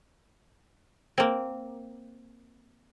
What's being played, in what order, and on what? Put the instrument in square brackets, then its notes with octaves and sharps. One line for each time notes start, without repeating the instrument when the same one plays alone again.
[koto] A#3 C4